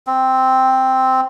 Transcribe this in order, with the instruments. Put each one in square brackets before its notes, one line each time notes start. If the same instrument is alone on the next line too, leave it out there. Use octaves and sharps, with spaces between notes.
[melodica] C4